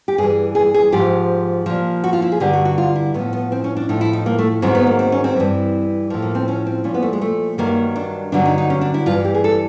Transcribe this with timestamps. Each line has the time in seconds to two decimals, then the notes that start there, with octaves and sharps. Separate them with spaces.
0.08 G4
0.18 G2 E3 G#4
0.55 G#4
0.74 G#4
0.92 G#2 F3 G4
1.66 A#2 F3
2.04 F#4
2.13 F4
2.22 E4
2.32 G#4
2.40 G2 D3 F#3 G4
2.53 F#4
2.65 F#4
2.78 F4
2.96 E4
3.14 A2 F3 B3
3.33 B3
3.52 C4
3.64 C#4
3.77 D4
3.89 A2 F3 D#4
4.01 E4
4.13 D#4
4.26 A#3
4.38 A3
4.62 G#2 D#3 F#3 C4
4.75 B3
4.87 A#3
4.99 C4
5.12 C#4
5.24 C4
5.36 G2 E3
6.10 A2 F3
6.22 A#3
6.35 C4
6.48 C#4
6.67 C4
6.84 A#2 F3 C#4
6.94 B3
7.02 A3
7.13 G#3
7.21 A3
7.58 G2 D#3 F#3 A#3
7.96 D4
8.32 G2 D3 F#3 D4
8.46 D#4
8.58 D#4
8.70 C#4
8.81 D4
8.94 E4
9.06 G2 F4
9.11 E3
9.25 G4
9.35 G#4
9.44 A4